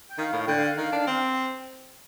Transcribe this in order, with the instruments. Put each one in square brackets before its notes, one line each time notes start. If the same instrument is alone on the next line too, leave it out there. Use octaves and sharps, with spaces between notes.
[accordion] G5
[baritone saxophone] D#3 [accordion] F5
[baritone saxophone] A2
[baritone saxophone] D3 [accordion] G5
[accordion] F5
F5
[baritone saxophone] D#3
D4
C4